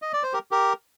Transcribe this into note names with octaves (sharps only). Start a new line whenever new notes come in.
D#5
D5
C5
G4 A#4
G4 A#4